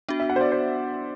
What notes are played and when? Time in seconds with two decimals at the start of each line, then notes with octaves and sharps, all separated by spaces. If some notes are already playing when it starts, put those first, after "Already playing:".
0.09 B3 D4 F#4
0.20 E5
0.29 F#5
0.36 C5
0.41 D5
0.52 C5